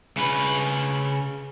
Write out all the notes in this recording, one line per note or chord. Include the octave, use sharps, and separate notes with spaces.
C#3 B4